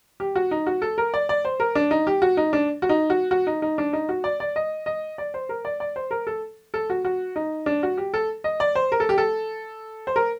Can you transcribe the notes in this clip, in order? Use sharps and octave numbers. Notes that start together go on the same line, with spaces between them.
G4
F#4
D#4
F#4
A4
A#4
D5
D5
C5
A#4
D4
D#4
G4
F#4
D#4
D4
F#4
D#4
F#4
F#4
D#4
D#4
D4
D#4
F#4
D5
D5
D#5
D#5
D5
C5
A#4
D5
D5
C5
A#4
A4
A4
F#4
F#4
D#4
D4
F#4
G4
A4
D#5
D5
C5
A#4
A4
G4
A4
C5
A#4